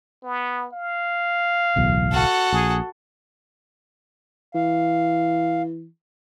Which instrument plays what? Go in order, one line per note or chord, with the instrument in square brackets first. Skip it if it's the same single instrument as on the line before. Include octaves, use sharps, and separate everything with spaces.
[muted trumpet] B3
F5
[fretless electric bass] D1 B1 E2
[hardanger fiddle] F#4 A4
[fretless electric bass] A#1 [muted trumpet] G#4
[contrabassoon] E3 [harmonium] F5